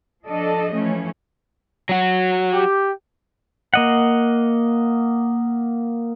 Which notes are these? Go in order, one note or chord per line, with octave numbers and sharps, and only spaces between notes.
F3 D4 A4 D5 D#5
E3 F3 A3 C#4
F#3 F#4
G4
A#3 D#5 F#5